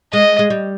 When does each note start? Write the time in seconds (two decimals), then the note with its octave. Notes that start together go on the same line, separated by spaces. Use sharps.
0.13 G#3 D#5
0.39 G#3
0.50 G3